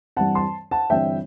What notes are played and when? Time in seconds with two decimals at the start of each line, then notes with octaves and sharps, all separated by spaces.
0.17 G2 E3 G3 C4 F#5 A5
0.35 A5 C6
0.71 F#5 A5
0.90 G1 G2 E3 G3 C4 E5 G5